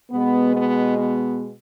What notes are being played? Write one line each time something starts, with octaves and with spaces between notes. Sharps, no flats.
B2 G#3 B3
B3
B3